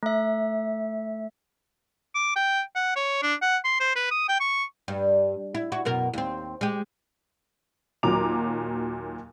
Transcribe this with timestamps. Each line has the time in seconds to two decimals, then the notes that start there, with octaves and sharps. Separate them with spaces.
0.03 A3 E5
2.15 D6
2.36 G5
2.75 F#5
2.96 C#5
3.22 D4
3.42 F#5
3.64 C6
3.80 C5
3.95 B4
4.11 D#6
4.29 G5
4.40 C#6
4.88 G2
5.55 E4
5.72 E4 F#4
5.85 F#2 B2 A#4
6.13 D#2 C4
6.61 G#3 G4
8.03 D#2 A#2 F#3 A#5 D6 F7